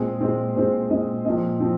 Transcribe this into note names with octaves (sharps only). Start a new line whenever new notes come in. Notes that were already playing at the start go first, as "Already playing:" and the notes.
Already playing: A#2 G#3 C4 G#4
A#2 G#3 C4
A#2 G#3 C4 C5
A#2 G#3 C4 D#5
A#2 F3 C4 D#5
F3 C4